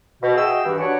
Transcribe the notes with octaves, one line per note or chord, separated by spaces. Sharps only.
B2
F#4 G#4 D#5 E5 G5 E6
G2 E3
D4 F#4 B4 C#5 D5 F#5